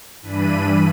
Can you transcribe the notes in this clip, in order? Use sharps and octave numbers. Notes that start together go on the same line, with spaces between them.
G2 E3 D4 B5 D#7